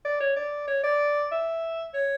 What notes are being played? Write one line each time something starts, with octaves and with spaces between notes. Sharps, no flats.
D5
C#5
D5
C#5
D5
E5
C#5